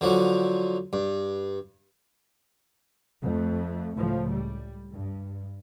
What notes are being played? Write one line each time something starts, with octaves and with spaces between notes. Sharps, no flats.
D3 F3 F#3
G2
F2 A3
C#2 A2 F3 A3
G3
G2